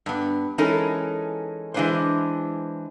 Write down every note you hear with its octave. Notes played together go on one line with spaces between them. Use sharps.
G2 B3
E3 G#3 C#4 D#4 A4 A#4
E3 G#3 B3 D4 B4 C5